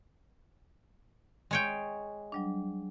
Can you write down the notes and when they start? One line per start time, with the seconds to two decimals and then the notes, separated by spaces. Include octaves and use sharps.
1.51 G#3 C#5 G5
2.32 F#3 G3 D4